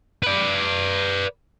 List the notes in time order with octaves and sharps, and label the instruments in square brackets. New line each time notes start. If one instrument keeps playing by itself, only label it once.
[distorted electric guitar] B4 D5